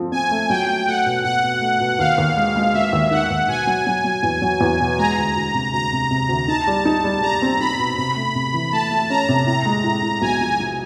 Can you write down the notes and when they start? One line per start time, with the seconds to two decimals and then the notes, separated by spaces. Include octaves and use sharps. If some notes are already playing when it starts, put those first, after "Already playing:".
Already playing: F3 A3 C4
0.12 C4 G#5
0.31 A3
0.50 F#3 G5
0.68 A3
0.87 A3 F#5
1.06 B2
1.24 B2 F#5
1.44 B2
1.61 A3
1.80 B2
1.99 D#2 F5
2.18 D#2
2.37 G#3
2.56 G#3
2.74 G#3 E5
2.93 D#2
3.11 D#3 F#5
3.30 D#2
3.48 B2 G#5
3.67 F#3
3.87 F#3
4.05 F#3
4.23 E2
4.42 F#3
4.61 E2
4.80 B2
4.99 G#3 A#5
5.17 D2
5.36 D2
5.54 C3
5.73 D2 A#5
5.92 C3
6.11 C3
6.29 D2
6.48 D#4 A5
6.67 G3
6.85 D#4
7.04 G3
7.22 G3 A#5
7.42 C4
7.60 D#4 B5
7.78 B2
7.97 C3 B5
8.16 A3
8.35 C3
8.54 E3
8.72 A3 A5
8.91 A3
9.10 C#4 A#5
9.29 C3
9.47 A2 A#5
9.65 G#3
9.84 A2
10.03 A2
10.22 B1 G#5
10.41 F3
10.60 F3